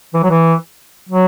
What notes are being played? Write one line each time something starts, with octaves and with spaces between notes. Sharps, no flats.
E3
F#3
E3
F#3